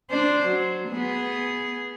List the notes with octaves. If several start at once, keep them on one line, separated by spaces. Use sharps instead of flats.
D4 C5
F#3
B3 G#4